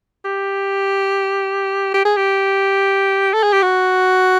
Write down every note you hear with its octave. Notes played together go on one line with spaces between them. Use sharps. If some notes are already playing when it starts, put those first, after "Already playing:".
G4
G4
G#4
G4
A4
G#4
G4
F#4